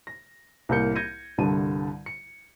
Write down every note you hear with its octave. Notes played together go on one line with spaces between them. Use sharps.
A#6
C2 A2 A#3 A#4 G6 C#7
G6 G#6 A#6 C#7 D#7
C2 G2 D3 A5 D#7
C#7